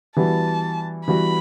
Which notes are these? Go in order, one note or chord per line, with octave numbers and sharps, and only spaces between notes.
E3 G3 B3 F#4 A5
E3 G3 B3 F#4 B5